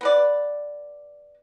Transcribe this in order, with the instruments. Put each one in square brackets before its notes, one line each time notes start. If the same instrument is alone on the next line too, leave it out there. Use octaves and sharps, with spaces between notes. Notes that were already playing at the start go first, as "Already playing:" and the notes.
[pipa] B3 B4 D5